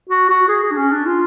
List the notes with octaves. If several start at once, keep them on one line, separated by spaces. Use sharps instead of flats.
F#4
F#4
G#4
G#4
D4
C#4
D4
F4